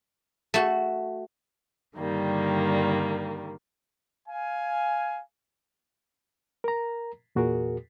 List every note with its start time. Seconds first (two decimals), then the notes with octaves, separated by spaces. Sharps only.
0.54 A3 F#4
1.97 G2 D3 D#3 G3 A#3
4.27 F5 G#5
6.64 A#4 A#5
7.35 E2 A#2 F#4 G#4 A#4